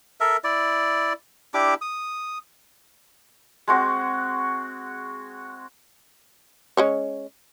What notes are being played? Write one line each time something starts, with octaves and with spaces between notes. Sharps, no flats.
A4 A#4 E5
E4 D5
D4 E4 G4 D6
D#6
G#3 C4 F#4
G#3 C#4 C#5